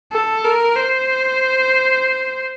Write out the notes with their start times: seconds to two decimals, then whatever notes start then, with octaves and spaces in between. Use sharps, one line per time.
0.12 A4
0.45 A#4
0.76 C5